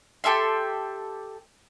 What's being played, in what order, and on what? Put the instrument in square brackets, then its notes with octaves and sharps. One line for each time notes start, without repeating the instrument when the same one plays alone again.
[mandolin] G4 A4 E5 C6